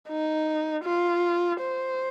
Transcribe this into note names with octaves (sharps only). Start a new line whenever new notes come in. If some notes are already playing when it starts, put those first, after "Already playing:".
D#4
F4
C5